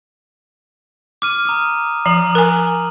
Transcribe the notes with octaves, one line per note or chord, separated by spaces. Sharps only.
D6 F6 D#7
A#5 D#6 F6
F3 A#5 F#7
A#4 G#5